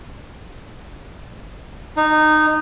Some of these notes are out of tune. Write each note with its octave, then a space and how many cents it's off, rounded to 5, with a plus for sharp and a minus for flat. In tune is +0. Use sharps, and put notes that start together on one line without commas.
D#4 -15